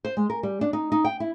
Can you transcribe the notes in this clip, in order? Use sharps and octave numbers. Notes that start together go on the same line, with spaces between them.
C5
G#3
A#4
G3
D4
D#4
D#4
G5
E4